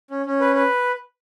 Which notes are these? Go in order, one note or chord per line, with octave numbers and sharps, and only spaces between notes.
C#4
C#4
B4
B4